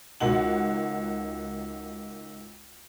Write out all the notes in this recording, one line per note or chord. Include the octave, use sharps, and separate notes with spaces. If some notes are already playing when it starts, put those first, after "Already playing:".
C#2 D#3 F#4 F#5 F#7